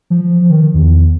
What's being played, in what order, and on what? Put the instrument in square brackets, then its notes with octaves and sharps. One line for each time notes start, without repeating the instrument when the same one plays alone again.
[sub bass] F3
D#3
E2